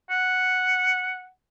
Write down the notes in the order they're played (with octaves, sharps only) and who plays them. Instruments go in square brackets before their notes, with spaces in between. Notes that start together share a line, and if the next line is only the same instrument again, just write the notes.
[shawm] F#5